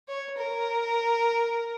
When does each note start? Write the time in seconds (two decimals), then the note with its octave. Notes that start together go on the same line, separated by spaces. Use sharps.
0.09 C#5
0.38 A#4